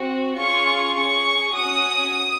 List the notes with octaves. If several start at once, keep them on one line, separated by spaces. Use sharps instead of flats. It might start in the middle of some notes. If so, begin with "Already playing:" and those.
Already playing: C4 F#4
C#4 F4 G#4 C#6
C#4 G#4 C#6
C#4 F#4 D#6